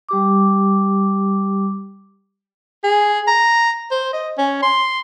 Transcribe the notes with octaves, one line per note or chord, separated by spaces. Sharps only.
G3 G4 D6
G#4
A#5
C5
D#5
C#4
C6